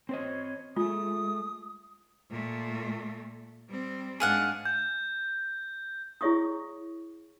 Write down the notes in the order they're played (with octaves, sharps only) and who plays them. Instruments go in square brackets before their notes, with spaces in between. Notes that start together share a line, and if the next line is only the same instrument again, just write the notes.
[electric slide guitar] C4 C5 D#5 [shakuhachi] C#5
[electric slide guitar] G#3 A3 [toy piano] F4 [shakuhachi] D#6
[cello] A#2 A3
G3 C4
[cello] G#2 D4 [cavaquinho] G#4 F5 F#5
[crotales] G6
[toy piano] E4 G#4 C#5 E5 C#6 D#6